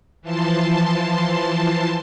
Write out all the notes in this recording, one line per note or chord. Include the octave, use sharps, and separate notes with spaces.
E3 F3 A5 C6